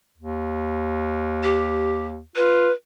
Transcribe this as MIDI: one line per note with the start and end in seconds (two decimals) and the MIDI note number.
0.17 2.21 39
1.43 2.07 67
2.36 2.69 65
2.36 2.72 71